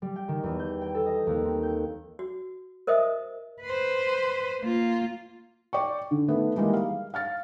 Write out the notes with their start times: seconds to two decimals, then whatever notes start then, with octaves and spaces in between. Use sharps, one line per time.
0.02 G3
0.16 G5
0.28 D#3
0.43 E2
0.59 G6
0.81 G5
0.95 A4
1.06 D#5
1.27 D#2
1.44 C4
1.63 G6
2.19 F#4
2.87 A#4 C5 D#5 E5 D#6
3.62 B4 C5
4.61 A#3 F4
5.73 D5 G5 C#6
6.11 D3
6.28 D#3 A3 B3
6.56 D#3 E3 G3 G#3 A#3 D#4
6.73 F5
7.14 F5 F6 A6